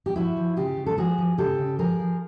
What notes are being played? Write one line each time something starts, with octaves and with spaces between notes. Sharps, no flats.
G4
F3 E4 F#4
F3
C#3 F4 G4
C#3
A4
F3 F#4 G#4
F3
C#3 G4 A4
C#3
F3 G#4 A#4
F3